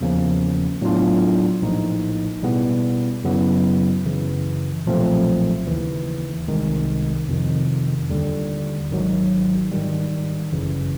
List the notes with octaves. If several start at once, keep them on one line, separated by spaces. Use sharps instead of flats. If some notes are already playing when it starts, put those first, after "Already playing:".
E2 C#3 F3 A#3 C#4
A2 F#3 B3 D4 F4
A#1 A2 F3 A#3 D#4
B2 G3 B3 E4 G#4
F#2 C#3 F#3 B3 E4
F#2 C#3 E3
B1 A#2 F3 A3 C4
D#2 C#3 E3
C2 C3 D#3 G#3
F2 C3 D#3
D#2 D3 G3
G#1 G#2 D#3 F#3
G#2 D#3 G3
G1 F#2 C#3 E3